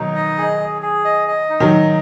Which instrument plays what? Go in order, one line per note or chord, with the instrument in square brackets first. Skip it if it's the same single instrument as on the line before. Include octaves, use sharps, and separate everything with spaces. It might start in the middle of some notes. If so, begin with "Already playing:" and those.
Already playing: [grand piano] B2 D#3 F#3 [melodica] D#4
[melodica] D#5
G#4
G#4
G#4
D#5
D#5
D#4
[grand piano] D#3 F#3
[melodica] D#5